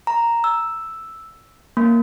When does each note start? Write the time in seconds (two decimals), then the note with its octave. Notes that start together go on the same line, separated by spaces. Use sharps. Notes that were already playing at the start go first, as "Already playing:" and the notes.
0.07 A#5
0.44 E6
1.77 A#3